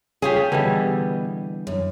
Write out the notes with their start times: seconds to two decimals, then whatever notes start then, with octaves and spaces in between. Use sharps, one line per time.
0.22 C#4 F4 G4 G#4
0.52 B2 D3 E3 G3 D#5
1.67 F#2